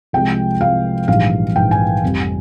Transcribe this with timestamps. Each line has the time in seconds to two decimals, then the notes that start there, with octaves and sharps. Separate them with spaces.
0.13 C2 C3 F3 G#3 G5
0.61 C2 C3 F3 G#3 F5
1.08 A#1 G#2 E3 G3 F5
1.55 A#1 G#2 E3 G3 G5
1.71 G#5
2.03 F1 F2 C3 G3